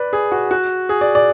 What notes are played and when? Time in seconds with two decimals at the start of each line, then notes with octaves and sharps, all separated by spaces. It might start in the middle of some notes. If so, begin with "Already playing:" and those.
Already playing: B4 D5
0.13 G#4
0.32 F#4
0.51 F#4
0.89 G#4
1.01 D5
1.15 D5